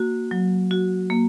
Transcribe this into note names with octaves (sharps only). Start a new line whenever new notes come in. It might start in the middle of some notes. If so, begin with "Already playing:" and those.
Already playing: A#3 F#4
F#3
F#4
A#3